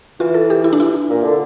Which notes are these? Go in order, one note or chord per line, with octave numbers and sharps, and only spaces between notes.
E3 F4
A4
G4
E4
D4
E4
A#2
D3